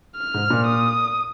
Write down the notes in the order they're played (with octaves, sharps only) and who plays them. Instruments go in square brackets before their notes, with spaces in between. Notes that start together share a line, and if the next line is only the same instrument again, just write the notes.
[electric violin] F6
[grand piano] G#2
A#2
[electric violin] D#6